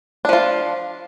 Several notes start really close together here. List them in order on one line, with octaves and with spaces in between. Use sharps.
D4 F3 F4